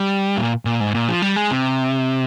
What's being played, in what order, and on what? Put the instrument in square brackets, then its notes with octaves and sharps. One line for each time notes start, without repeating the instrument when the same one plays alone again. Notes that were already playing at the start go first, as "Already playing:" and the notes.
Already playing: [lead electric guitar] G3
A#2
A#2
G#2
A#2
F3
G3
G#3
C3